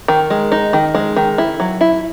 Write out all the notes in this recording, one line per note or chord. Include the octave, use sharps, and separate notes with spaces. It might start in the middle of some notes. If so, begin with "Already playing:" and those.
D#3
G#3
D#4
D#3
G#3
D#3
E4
F#3
E4